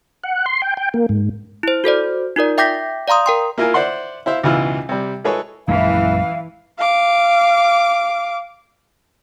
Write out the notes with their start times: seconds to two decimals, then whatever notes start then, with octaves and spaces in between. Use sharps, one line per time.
0.24 F#5
0.46 C6
0.62 G5
0.77 G5
0.94 A#3
1.09 G#2
1.63 E4 C5
1.84 F#4 A4 C5 D5
2.36 D#4 F4 A#4 D5
2.58 E5 G5 D6 G6 A#6 B6
3.08 D5 F5 A#5 C6 D#6
3.26 A#4 G5 C6
3.58 A#3 E4 F4 A#4 G#5
3.74 C5 D5 E5 F#5 C6
4.26 E4 C5 E5 F5
4.43 C#2 G#2 B2 E3 E4 F4
4.89 C3 G3
5.24 G#3 E4 G#4 A4 B4 C#5
5.68 A#1 F#2 E3 G#3 F5
6.78 F5 D6